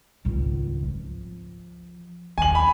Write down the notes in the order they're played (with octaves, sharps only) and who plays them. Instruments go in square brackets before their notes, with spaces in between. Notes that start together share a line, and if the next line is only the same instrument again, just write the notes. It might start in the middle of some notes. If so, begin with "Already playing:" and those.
[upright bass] G#1 C#2
F3
[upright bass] D#2 [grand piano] G#5 F#7
[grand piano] B5